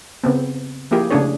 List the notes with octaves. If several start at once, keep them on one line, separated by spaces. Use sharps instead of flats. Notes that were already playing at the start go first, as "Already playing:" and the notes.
C#3 B3 C4
F3 A#3 E4 G4 G#4
C#3 A3 C#4 D4 G#4 C#5